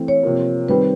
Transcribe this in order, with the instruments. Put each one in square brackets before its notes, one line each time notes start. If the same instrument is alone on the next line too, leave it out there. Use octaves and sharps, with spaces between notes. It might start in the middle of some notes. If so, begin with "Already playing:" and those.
Already playing: [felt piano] E3 A3 C4
[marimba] C#5
[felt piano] C3 F3 A#3
[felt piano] D#3 G3 C4 [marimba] B4